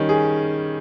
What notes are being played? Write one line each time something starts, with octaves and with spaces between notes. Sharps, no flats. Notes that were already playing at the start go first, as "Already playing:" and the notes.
Already playing: D#3 G3 C#4
G#4